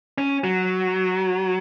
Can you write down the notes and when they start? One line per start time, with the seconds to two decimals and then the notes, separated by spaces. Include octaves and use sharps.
0.18 C#4
0.44 F#3